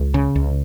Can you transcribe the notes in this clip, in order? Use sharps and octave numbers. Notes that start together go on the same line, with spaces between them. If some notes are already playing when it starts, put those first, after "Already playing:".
Already playing: C#2
C#3
C#2